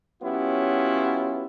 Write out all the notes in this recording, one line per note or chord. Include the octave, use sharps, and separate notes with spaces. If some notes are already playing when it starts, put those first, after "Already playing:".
F#3 B3 C#4 E4 F4 G4